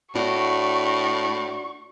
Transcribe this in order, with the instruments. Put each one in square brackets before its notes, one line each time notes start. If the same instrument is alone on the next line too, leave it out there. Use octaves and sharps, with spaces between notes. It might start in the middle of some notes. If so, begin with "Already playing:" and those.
[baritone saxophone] A2 [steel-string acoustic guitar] D4 F#4 D5 [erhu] C#6